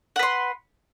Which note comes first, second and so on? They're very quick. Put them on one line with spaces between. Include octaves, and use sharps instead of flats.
F#5 B4 C6